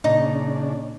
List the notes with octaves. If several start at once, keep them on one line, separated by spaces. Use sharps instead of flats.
A#2 C#3 D4 D#4